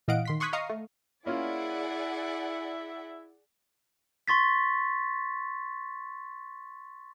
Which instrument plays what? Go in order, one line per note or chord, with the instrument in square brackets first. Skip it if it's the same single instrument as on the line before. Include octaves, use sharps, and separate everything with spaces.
[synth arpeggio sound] A#2 E3 D#5 F5 F#5 D7
D#3 C6 B6
C6 C#6 D#6 F#6 G#6 B6
D#5 F5 A#5 C#6 D#6 C7
A3
[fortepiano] A#3 C#4 F4 [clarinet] E4 [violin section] G#4 D5 F#5 [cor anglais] E5
[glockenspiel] C6 C#6 A6 B6